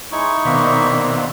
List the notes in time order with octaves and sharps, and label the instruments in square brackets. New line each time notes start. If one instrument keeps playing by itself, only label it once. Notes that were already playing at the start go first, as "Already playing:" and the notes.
[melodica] G#3 C#5 [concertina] D#4 E4 C#6
[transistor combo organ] B2 D#3 C4 [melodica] A#3 D4 E5